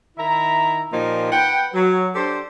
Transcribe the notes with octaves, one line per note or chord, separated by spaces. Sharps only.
D#3 E4 E5 A#5
A#2 F3 A#3 D#4 G4
B4 F#5 G5
F#3
D4 G4 A4 C5